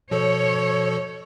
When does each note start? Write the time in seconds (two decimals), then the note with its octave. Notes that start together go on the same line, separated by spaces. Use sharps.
0.11 B2 F3 A4 C#5